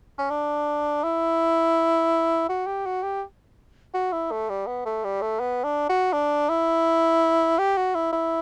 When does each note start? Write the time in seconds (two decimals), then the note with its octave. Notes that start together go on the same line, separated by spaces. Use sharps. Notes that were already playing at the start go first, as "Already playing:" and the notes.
0.18 C#4
0.30 D4
1.04 E4
2.49 F#4
2.66 G4
2.86 F#4
3.03 G4
3.94 F#4
4.12 E4
4.31 A3
4.49 G3
4.67 B3
4.86 A3
5.04 G3
5.22 A3
5.40 B3
5.64 D4
5.89 F#4
6.13 D4
6.49 E4
7.59 G4
7.77 F#4
7.95 E4
8.13 E4